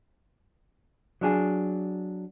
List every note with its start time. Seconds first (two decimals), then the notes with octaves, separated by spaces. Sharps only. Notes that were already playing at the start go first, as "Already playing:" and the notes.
1.21 F#3 D4 G#4